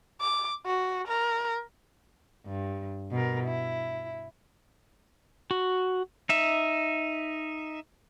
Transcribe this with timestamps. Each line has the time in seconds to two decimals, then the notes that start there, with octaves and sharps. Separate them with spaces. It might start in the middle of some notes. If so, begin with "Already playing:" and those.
0.21 D6
0.66 F#4
1.08 A#4
2.45 G2
3.11 B2 A#4
3.44 E4
5.51 F#4
6.29 D#4 E5